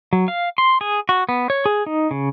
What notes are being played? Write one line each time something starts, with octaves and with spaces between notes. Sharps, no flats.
F#3
F5
C6
G#4
F#4
B3
C#5
G#4
D#4
C#3